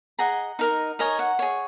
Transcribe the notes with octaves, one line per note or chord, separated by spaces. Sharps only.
G#4 D#5 F#5 A#5
D#4 A#4 D#5
D#4 A#4 C#5 D#5 G#5
F#5
G#4 C#5